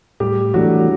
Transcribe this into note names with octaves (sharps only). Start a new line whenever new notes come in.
A2 G3 G4
E3 F#3 A3 D4 F#4